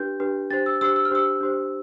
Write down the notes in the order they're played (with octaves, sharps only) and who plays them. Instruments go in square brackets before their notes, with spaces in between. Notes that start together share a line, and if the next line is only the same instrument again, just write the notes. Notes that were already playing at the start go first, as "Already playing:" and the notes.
Already playing: [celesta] D4 G4 B4 G6
D4 G4 B4
D4 G4 C5 A6
E6
D4 G4 C5 E6
E6
F6
D4 G4 C5 E6
D4 G4 C5